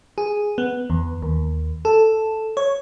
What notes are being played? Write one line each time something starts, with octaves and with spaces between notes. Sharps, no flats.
G#4
B3
E2
D#2
A4
C#5